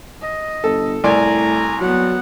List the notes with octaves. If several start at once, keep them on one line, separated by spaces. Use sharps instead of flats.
D#5
G1 A4
C2 A2 D5 G#5 A#5
F#3 B3 F#5